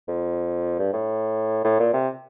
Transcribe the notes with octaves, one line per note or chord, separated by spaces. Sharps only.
F2
G2
A2
A2
A#2
C3